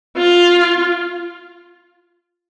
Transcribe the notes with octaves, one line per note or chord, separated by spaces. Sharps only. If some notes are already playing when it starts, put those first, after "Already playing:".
F4